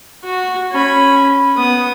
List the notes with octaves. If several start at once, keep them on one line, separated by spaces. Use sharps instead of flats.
F#4
C#4 B5
B3 D#6